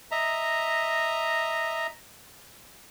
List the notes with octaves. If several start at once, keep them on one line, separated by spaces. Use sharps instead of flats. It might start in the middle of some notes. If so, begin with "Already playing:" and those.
D#5 E5 A#5